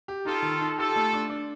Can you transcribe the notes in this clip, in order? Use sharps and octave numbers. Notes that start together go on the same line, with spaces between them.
G4
D#4 F4 A4
D#3
D#4
F4 G4 A4
A3
D4
D4